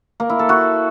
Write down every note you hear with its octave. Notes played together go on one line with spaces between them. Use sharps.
A#3
E4
A4
F#4